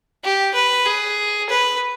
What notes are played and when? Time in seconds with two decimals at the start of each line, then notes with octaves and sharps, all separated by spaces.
0.23 G4
0.54 B4
0.86 G#4
1.49 B4